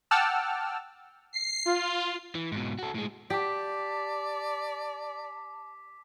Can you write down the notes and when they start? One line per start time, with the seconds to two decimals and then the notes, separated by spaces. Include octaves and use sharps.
0.11 F#5 G5 A5 D6 E6 F6
1.33 C7
1.66 F4
2.35 E3
2.52 G#2 B2
2.79 F#4 A4
2.94 A2 G#3
3.30 G4 D5 A5 D6 B6